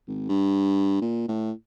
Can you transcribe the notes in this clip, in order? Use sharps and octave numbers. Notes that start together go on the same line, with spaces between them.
G#1
G2
A#2
A2